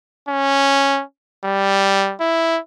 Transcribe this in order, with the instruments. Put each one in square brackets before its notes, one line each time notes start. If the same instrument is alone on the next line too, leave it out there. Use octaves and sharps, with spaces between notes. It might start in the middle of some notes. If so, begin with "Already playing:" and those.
[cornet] C#4
G3
E4